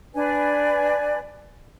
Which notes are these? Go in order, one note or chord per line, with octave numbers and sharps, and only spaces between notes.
D4 B4 D5 G#5